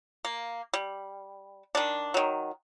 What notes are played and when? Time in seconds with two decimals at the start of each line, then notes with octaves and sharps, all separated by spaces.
0.25 A#3
0.74 G3
1.75 D#3 D4
2.14 D#3 F#3